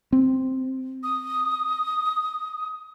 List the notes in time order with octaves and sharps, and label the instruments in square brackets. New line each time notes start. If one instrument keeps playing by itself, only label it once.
[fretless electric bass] C4
[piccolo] D#6